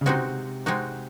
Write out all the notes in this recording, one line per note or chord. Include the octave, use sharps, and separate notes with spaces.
C#3
C3 G#3 C4 D#4 F#4
G#3 C4 D#4 F#4